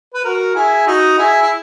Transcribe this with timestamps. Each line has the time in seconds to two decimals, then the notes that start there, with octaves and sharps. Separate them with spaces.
0.14 B4
0.24 F#4 A#4
0.55 E4 G#4
0.87 D#4 F#4
1.18 E4 G#4
1.42 E4